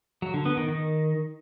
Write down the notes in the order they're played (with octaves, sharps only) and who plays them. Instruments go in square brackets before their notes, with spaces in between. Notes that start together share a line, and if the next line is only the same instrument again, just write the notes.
[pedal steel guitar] F#3
D3
B3
D#3
D#3